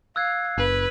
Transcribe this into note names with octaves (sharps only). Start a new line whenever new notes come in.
F5 E6 F#6 G#6
F#1 B4